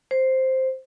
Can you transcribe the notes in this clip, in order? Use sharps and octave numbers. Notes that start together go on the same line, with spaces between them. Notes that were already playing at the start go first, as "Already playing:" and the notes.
C5